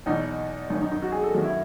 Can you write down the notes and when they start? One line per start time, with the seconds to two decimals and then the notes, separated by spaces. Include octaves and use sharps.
0.06 E2 B2 F#3 D#4
0.70 F#2 D#3 F#3 D#4
0.81 D#4
0.91 D#4
1.02 F#4
1.12 G#4
1.23 A4
1.34 F#2 D#3 F#3 F#4
1.44 E4